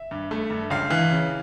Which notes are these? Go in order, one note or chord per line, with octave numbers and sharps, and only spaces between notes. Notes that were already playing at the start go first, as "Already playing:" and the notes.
Already playing: E5
G2
A3
G2
C#2 F5
E3
C#3